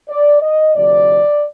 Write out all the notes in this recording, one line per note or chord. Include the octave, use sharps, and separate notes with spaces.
D5
D#5
D2 C3 F3 D5